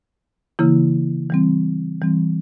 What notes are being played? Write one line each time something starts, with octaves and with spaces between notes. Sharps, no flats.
C#3 E3 A#3 E4
E3 G3 C4
E3 G3 C4